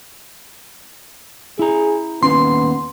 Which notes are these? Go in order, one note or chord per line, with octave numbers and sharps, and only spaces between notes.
E4 G#4 A#5
D#2 B3 C#4 B4 C6